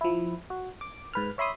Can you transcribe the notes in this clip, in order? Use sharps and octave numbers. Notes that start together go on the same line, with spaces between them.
F3 E4
F#4
D6
G#2 B4 F6
C#5 E5 B5 C6 D#6